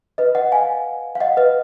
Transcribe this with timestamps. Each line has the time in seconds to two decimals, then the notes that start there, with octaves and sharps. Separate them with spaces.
0.18 B4 D#5
0.35 D#5 F#5
0.52 F5 G#5
1.15 F5
1.20 D#5 F#5
1.37 B4 D#5